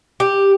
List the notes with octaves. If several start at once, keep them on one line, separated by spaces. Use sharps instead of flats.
G4